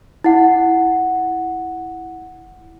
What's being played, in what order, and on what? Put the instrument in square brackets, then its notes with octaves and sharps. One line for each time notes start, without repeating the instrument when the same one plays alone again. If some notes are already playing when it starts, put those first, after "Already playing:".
[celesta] E4 F#5